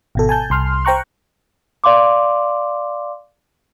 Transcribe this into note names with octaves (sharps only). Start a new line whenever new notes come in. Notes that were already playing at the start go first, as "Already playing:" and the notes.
G#1 B2 A4
G#5 A5 G6
C2 C6 F6
C5 G5 A#5 C#6 F#6
D5 F5 C6 D6